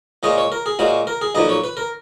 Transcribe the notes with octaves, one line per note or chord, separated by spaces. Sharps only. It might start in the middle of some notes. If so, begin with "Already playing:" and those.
A#2 G#3 C#4 D#5
C#5
A#4
G#4
A#2 G#3 C#4 F#4
A#4
G#4
B1 A#2 F3 D#5
C#5
B4
A#4